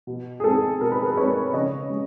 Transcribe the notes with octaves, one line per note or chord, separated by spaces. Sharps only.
B2
G#4
G#3 C4 D#4 A4
B2 A#4
B4
G#4 A#4
G#3 C4 D#4 B4 C#5
C#3 C#5 D#5
G#3